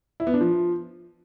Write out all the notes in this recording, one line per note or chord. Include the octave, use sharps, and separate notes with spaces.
E4
B3
D4
F3